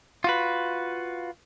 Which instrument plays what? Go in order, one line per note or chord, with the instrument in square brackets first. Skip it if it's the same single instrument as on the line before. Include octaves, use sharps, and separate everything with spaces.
[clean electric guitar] F4 F#4 B4